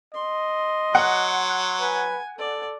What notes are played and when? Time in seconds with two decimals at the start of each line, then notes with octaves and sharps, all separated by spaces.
0.14 D#5 C6
0.95 F#3 F#5 F#6
1.80 B4 G#5
2.38 A4 D5